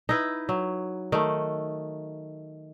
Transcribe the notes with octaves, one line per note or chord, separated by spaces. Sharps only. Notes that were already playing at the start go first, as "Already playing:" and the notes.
D#4 E4 B4
F#3
D#3 A3